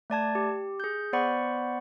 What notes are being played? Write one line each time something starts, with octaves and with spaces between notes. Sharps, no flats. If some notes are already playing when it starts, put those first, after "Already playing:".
A3 D5 A5 G#6
G4
G#4 G6
B3 C5 D5 F#5 B5 C#6